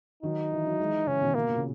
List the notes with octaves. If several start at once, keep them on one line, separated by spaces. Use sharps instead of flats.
D#3 F#3 D#4
E3
F#3
E3 G#3
C#3 E3 C#4
B2 D#3
B2 A#3
A#2
C#3